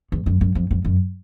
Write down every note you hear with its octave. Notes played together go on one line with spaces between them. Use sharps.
E2
F#2
F#2
F2
F2
F#2